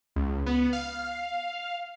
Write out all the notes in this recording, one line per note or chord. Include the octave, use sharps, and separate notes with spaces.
C#2
B3
F5